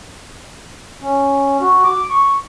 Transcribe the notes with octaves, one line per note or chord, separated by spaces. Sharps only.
C#4
F#4
D6
C#6